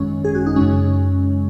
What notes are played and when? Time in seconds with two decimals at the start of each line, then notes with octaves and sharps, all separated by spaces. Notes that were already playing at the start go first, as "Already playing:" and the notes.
Already playing: G#1 F#2 D#3 G#3 C#4
0.24 G#4
0.35 F#4
0.46 D#4
0.56 F#2 C#3 G#3 C#4